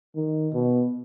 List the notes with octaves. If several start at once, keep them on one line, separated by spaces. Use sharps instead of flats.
D#3
B2